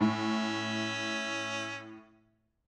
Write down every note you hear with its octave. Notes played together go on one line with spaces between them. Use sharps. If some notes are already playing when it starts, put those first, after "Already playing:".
A2 C#4 E5